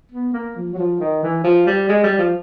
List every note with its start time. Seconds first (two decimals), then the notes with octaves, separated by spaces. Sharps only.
0.12 B3
0.33 A#3
0.56 F3
0.73 F#3
0.78 F3
1.00 D#3
1.23 E3
1.44 F3
1.66 G3
1.89 G#3
2.04 G3
2.18 F3